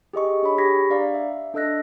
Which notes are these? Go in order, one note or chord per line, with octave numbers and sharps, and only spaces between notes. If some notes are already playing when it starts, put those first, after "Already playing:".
G4 G#4 D#5 C#6
D4 G#4 C#5 B5
G4 B5 C#6 G#6 A#6 B6
D4 D5 F5 A#5
E5
D4 A4 D#5 E6 F#6 A#6